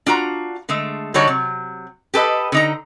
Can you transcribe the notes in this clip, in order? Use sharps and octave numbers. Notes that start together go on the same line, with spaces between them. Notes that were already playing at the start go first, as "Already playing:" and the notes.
D4 F4 F#4 A#5
D3 G#3 A3
D3 G3 D4 D#4 F#4 C#5
C3 F#3
G4 A4 B4 D#5
D3 D#4 A#5